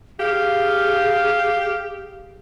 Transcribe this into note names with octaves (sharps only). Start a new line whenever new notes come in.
G4 G#4 F5